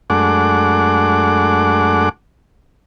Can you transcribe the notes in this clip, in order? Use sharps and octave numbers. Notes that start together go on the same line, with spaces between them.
F#2 G#3 A3 D4 F#5 D6